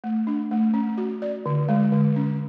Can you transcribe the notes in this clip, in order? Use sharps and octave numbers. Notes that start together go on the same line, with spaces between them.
A3
D4
A3
C#4
F#4
D5
D3
G#3
D3
C#4